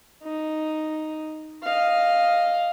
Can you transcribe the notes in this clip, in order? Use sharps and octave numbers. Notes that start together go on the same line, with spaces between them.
D#4
D#5 F5